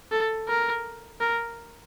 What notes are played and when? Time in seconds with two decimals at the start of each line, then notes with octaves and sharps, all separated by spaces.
0.12 A4
0.49 A#4
1.21 A#4